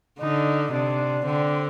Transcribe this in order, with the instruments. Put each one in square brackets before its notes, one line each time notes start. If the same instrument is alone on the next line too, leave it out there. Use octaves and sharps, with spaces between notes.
[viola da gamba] D3 [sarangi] D#4
[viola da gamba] C3 [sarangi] D4
[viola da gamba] D3 [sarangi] C4